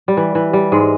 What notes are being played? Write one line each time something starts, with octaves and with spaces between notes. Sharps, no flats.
G3
E3
E3
G3
G#2 G#3